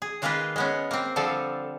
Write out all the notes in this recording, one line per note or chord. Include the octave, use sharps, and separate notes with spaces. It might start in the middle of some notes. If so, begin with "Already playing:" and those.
G#4
D#3 G#3 A#3 F4 G#4 B4
G#3 B3 C#4
A#3 C4
D3 F3 G3 A4 F5